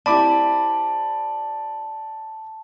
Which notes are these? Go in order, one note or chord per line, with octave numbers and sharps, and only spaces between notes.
C4 E4 G4 D5 A5 B5 D6